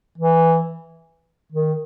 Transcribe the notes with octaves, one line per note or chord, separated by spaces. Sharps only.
E3
D#3